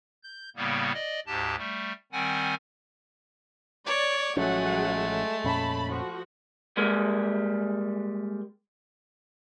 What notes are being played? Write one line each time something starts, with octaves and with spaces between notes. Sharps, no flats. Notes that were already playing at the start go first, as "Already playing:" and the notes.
G6
A2 C#3 G3 A#3 B3
D5 D#5
D2 G#2 G4 A5
G3 A3
D#3 G3 C4 F#5 G#5
C#5 D5
A1 F3 F#3 G#3 A3 C#4 G#4 F#5
F2 A#2 C#4 A5 B5
F3 F#4
G3 G#3 A#3